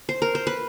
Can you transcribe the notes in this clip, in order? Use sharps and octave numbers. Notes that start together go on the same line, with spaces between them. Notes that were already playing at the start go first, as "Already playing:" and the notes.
C5
A#4
C5
B4